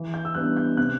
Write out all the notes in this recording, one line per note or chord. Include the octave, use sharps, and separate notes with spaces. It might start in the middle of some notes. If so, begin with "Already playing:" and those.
Already playing: E3
G6
E6
G3 B3 D4 F#6
G6
C3 F#6